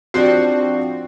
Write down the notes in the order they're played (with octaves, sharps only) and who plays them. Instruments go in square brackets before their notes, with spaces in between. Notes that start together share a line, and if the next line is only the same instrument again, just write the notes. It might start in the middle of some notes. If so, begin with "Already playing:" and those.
[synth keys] F3 C4 F#4 [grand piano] D4 G4 C7